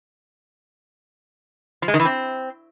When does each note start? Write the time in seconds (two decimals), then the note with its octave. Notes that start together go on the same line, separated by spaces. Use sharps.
1.82 F3
1.88 G#3
1.94 D#3
2.00 E3
2.05 C4